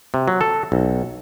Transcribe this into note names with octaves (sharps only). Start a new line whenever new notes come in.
C3
F#3
A4
B1